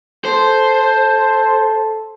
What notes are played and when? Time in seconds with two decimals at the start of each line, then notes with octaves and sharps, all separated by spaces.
0.25 A4 C5